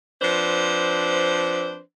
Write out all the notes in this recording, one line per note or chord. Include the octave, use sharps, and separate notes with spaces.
F3 C4 D4 B4 C5